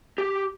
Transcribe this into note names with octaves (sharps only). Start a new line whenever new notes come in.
G4